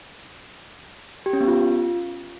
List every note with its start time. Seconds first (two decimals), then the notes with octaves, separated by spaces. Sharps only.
1.26 G4
1.33 C#4
1.41 B3
1.48 F4